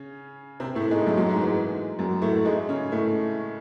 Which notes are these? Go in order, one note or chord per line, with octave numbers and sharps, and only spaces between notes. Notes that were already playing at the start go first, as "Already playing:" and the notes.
Already playing: C#3 C#4
C3 C4
A2 A3
G#2 G#3
F#2 F#3
F#2 F#3
G#2 G#3
E3
F#2 F#3
A2 A3
G#2 G#3
C#3 C#4
A2 A3